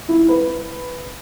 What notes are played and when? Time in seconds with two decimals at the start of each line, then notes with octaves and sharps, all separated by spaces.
0.09 E4
0.29 B4